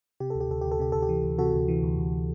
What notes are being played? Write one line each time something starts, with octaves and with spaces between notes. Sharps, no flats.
C3 G4
D2 A4
G4
D2 A4
D2 G4
A4
C3 G4
D2 A4
G4
E3
D2
C3 F#4 A4
D2
E3
D2
D2